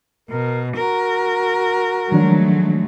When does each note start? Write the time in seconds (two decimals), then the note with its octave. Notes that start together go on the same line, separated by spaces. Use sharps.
0.30 B2 A#4
0.76 F#4 A#4
2.12 D#3 F3 F#3 G#3 A3 D4